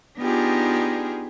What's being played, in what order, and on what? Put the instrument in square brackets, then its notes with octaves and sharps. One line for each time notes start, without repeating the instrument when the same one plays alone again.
[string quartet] B3 D4 D#4 F4 G4 G#4